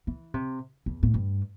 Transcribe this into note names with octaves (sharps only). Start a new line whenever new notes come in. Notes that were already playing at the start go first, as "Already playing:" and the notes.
E3
C3
E2
A2
G2